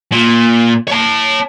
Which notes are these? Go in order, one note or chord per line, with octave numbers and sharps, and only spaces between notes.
A#2
C#5 A5